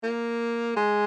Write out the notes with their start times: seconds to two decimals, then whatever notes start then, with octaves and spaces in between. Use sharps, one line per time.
0.03 A#3
0.76 G#3